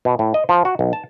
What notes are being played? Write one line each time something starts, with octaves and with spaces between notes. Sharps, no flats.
B2
A2
D#5
F3
F#4
B1
A5